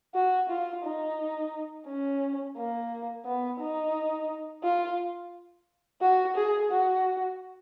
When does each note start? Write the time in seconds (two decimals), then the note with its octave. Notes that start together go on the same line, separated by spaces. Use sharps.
0.15 F#4
0.49 F4
0.84 D#4
1.87 C#4
2.57 A#3
3.26 B3
3.60 D#4
4.64 F4
6.01 F#4
6.36 G#4
6.71 F#4